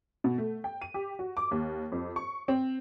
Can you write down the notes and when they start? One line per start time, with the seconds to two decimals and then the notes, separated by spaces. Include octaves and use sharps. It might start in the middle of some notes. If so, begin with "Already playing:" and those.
0.24 B2
0.38 A3
0.64 G5
0.82 D#7
0.94 G4
1.19 F#4
1.37 D6
1.51 D#2
1.92 F2
2.16 C#6
2.48 C4